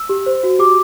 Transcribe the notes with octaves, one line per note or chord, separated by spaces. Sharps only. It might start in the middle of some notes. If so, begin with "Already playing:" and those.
Already playing: E6
G4
C5
F#4
G4 D6